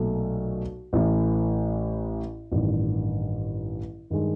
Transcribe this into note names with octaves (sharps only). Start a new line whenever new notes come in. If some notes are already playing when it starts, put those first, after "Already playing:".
Already playing: B1 A#2 F#3 A3
A1 A2 E3
A1 G2 D#3
G2 D#3 G#3